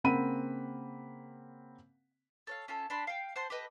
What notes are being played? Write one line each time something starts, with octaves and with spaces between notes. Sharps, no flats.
C#3 A#3 C4 F#5 B5 D#7
A4 C#5 F5
C#4 F4 A4
D4 A5 B5 C6
F5 G5
C5 F#5 A5 C6
G4 A4 B4 D#5